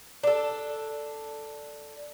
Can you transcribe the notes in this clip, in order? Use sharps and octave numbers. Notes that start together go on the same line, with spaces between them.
D4 A4